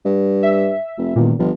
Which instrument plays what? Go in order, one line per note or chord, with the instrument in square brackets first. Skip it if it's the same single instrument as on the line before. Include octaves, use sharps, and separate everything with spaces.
[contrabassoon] G2
[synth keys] E5
[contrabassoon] F1
[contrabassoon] E1 [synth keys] A#2 D#3
[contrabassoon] G1 [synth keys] F3